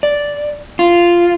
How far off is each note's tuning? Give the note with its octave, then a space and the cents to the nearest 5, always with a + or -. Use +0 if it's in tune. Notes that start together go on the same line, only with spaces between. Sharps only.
D5 -5
F4 -10